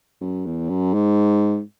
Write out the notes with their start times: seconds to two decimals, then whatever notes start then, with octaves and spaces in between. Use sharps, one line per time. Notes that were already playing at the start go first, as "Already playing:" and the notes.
0.21 F#2
0.45 E2
0.69 F#2
0.94 G#2